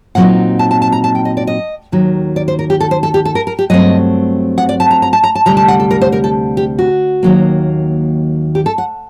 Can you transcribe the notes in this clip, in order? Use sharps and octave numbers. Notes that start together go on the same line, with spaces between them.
A#2 F#3 C4 D#4 F#5
A5
A5
A5
A#5
A5
G5
D#5
D5
D#5
D#2 D#3 F#3
D5
C5
A#4
G4
A4
C5
A4
G4
A4
A#4
A#4
G4
G2 F#3 A3 C4 D#5
F#5
D5
A5
A#5
A#5
A5
A#5
A5
D2 C3 G3 A#5
A5
F#5
A4
A#4
C5
A#4
A4
G4
F#4
D#2 D#3 F#3 A#3
G4
A4
F#5